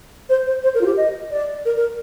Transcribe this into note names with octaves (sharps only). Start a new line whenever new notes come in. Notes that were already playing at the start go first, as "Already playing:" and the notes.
C5
C5
C5
A#4
F4
G4
D#5
D5
A#4
A#4